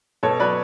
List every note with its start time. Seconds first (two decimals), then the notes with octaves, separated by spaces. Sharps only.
0.23 B2 A4 C#5
0.40 F#3 B4 D5